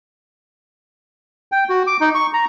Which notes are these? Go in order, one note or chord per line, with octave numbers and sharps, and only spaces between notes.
G5
F#4
D6
D#4
C#6
A#5